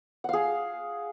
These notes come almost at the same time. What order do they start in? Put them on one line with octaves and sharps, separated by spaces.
F#5 F5 G#4